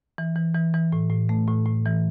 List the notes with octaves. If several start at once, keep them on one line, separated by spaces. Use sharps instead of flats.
E3
E3
E3
E3
A2
A2
A3
A2
A2
E3